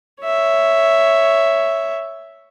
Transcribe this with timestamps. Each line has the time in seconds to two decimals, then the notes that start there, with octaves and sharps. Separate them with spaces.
0.23 C#5 E5